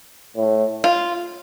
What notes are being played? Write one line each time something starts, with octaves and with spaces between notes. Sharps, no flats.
A2
F4